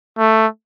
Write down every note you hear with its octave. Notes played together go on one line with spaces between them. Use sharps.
A3